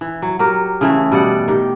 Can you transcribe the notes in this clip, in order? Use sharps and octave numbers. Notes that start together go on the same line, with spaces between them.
E3
F#3
F#3 G4 A#4
C#3 E3 A3
B2 G3 D5 F#5
D#3 G4